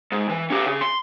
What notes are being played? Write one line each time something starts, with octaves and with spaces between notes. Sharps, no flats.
G#2
E3
C#4 G4
C#3
C6